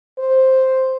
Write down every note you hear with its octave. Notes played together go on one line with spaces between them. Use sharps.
C5